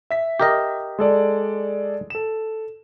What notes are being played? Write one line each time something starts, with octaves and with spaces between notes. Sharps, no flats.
E5 B6
G4 A#4 D#5
G#3 A4 D5
A4 E7